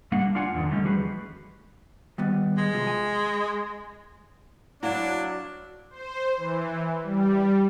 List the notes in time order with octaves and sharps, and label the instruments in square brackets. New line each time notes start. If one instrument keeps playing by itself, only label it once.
[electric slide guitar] G3 A#3 D4 F#5
D4 F4 D5 F#5 G#5
E2 A#2 D3 D#3
E3 F#3 G3 A3 C#4 D#4
F3 G3 F#4 G#4 B4
[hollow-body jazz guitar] D#3 G3 B3
[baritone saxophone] G#3
[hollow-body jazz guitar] C3 F3
G#5
[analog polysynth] F#3 [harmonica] D4 [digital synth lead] E4 [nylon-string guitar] D5 F5 F#5
[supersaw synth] C5
E3
G3